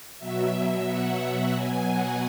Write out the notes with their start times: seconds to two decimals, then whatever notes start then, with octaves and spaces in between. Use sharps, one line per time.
0.19 B2 F#3 E5
0.52 E5
0.87 F#5
1.53 B2 F#3 G#5
1.87 F#5